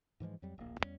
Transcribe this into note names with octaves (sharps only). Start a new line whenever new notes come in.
G#2 E3 F3 G#3
F2 F#3 G3
D1 A#1 A#3
E2 G2 G3 C#4